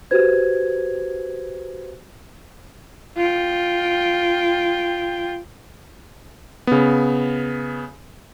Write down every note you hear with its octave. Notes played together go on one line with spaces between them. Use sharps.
F#4 G4 B4 C5 G#6
F4 G5
C#3 B3